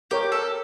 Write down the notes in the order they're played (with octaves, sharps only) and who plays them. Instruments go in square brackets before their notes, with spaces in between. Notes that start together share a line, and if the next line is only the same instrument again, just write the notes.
[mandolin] G4 [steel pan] A#4 C#5
[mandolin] A4